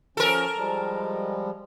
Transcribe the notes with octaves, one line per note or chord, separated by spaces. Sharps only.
F3 C#4 A4 A#4
F3 G3 G#3